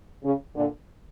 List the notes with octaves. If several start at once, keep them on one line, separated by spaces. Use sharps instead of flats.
C#3
A#2 D3